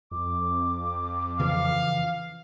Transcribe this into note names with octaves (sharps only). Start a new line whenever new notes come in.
F2 D6
C#3 E3 F3 F5